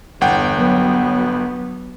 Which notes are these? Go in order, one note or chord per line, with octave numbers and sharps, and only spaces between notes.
G1 E2 F#5 G5
F#3 B3